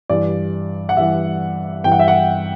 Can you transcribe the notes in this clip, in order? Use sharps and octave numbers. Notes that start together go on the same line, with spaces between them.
G2 E3 D5
F#5
G2 E3 E5
G2 E3 G5
F#5
E5
F#5